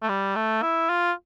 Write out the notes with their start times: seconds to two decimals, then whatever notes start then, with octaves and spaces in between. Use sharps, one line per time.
0.02 A3
0.09 G3
0.36 A3
0.62 E4
0.89 F4